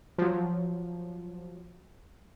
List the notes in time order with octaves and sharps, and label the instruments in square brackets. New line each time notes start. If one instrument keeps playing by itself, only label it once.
[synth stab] F3 F#3